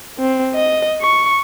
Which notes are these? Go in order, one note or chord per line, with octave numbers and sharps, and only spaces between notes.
C4
D#5
C#6